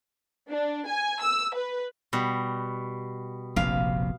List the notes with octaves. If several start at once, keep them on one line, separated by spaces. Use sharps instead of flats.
D4
G#5
E6
B4
B2 G3
F1 A#1 C3 F5